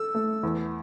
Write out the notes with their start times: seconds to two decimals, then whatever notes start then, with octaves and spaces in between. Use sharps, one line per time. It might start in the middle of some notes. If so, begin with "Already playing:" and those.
Already playing: A4 E6
0.15 A3
0.43 E2